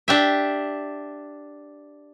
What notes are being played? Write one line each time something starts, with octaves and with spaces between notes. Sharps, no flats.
D4 G4 E5